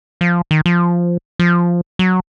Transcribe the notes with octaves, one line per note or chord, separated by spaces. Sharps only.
F3
D#3
F3
F3
F#3